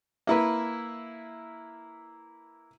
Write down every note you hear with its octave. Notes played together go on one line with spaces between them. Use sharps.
A#3 E4 B4